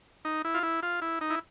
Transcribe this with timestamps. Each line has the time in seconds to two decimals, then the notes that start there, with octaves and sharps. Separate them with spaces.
0.25 D#4
0.45 E4
0.54 F4
0.63 E4
0.83 F4
1.02 E4
1.21 D#4
1.30 E4